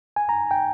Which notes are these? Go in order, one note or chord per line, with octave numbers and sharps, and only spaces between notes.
G#5
A#5
G5